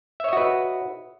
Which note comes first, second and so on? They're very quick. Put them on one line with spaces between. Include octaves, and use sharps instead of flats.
E5 C#5 D#5 F#4 B4